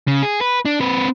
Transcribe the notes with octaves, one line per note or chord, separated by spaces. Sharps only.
C#3
G#4
B4
D4
C4 B4